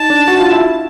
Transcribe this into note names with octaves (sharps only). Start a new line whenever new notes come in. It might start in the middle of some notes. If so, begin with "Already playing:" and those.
Already playing: D#4 A5
D4
F#4
F4
E4